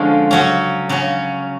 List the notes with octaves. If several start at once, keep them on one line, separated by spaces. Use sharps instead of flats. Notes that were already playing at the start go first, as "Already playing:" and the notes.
Already playing: D3 F3 G#3 C#4 F4
C#3 F#3 C#4
C#3 F#3 C#4